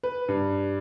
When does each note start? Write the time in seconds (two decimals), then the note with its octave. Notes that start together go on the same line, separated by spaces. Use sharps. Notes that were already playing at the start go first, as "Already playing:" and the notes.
0.03 B4
0.28 G2